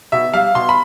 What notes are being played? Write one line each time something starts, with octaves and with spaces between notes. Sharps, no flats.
B2 E5
G3 F5
B2 C6
B5